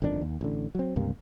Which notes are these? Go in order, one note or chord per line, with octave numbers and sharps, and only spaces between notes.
G1 F2 D#3 D4
D#2
A1 D3
F#3 C4
C#2 G2 C3 A#3